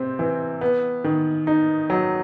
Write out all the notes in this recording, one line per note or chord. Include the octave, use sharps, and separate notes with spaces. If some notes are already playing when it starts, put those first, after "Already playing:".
Already playing: C3 C4
E3
B3
D#3
D#4
F#3